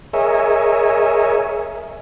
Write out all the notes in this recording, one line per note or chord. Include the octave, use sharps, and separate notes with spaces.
G#4 A#4 C#5 D#5 E5